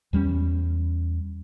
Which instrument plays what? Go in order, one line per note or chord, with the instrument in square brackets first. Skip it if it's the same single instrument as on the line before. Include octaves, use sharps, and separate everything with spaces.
[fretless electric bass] E2 G3 G#3 C#4